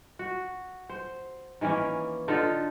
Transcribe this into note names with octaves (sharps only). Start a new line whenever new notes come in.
F#4
C5
D#3 E3 A#3 C#4
D3 D#4 F4 A4